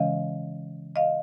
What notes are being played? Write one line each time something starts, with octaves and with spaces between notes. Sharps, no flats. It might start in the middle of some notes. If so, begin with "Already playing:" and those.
Already playing: C#3 E3 G#3 C#4 D#5 F5
D#5 F5